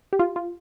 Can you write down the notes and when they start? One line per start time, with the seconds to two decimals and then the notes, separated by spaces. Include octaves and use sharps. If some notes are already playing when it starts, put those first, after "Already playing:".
0.13 G4
0.19 F4
0.36 F4